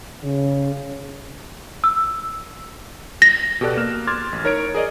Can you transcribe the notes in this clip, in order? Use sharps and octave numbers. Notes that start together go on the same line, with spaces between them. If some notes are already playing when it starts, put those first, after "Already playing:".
C#3
E6
A#6
B2 G4 A4 D5 F#6
A#3 F6 E7
C6 D6 F6 G#6 A6
A1
D#4 A#4 C#5 A#5 G#6 D7
G#4 A#4 D5 D#5